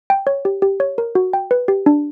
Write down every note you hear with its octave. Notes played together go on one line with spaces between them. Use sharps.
G5
C#5
G4
G4
C#5
A#4
F#4
G5
B4
G4
D4